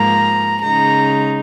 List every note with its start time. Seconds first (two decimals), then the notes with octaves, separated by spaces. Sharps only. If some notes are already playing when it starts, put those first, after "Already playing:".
Already playing: G#2 F3 A#3 A#5
0.64 C#3 G#3 D#4 A#5